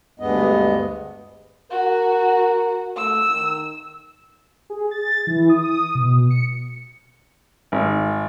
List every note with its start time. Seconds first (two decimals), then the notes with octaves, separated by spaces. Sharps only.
0.20 D2 G2 G#3 B3 D#5
1.71 F#4 A#4
2.97 A3 E6
3.29 D#3
4.70 G#4
4.91 A6
5.27 E3
5.49 D#6
5.95 B2
6.30 C#7
7.72 G#1